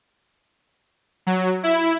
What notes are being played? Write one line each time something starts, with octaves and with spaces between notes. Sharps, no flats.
F#3
E4